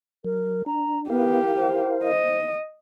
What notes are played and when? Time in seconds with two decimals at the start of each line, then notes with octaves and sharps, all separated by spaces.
0.24 F#3 A#4
0.66 D4 A#5
1.10 B3 E4 G4 A#4 F5
1.56 C5
2.04 D#5